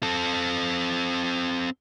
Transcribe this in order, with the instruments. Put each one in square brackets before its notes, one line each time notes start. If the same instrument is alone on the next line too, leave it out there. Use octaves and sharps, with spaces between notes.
[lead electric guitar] C4 A4